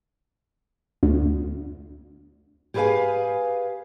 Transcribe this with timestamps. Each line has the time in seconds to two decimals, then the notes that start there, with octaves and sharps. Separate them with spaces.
1.03 D2
2.74 G4 G#4 B4 C5 F5 G#5